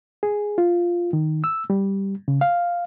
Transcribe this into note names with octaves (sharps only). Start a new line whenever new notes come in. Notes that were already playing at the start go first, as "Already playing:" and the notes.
G#4
F4
D#3
E6
G3
C#3
F5